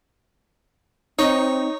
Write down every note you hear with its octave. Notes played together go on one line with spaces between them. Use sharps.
C4 D#4 C#5